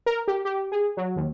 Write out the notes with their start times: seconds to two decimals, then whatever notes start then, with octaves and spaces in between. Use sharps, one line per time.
0.06 A#4
0.28 G4
0.45 G4
0.72 G#4
0.97 F#3
1.16 D#2